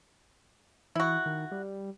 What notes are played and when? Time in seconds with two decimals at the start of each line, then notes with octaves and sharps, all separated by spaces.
0.95 E3 E4 F#4
1.26 D#3
1.52 G3